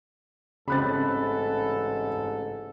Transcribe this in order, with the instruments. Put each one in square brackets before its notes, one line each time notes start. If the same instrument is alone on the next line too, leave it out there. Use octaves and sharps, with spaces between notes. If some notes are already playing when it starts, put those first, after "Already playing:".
[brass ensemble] A1 G#2 A4 [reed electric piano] C#3 C4 [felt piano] B5 F#6 A6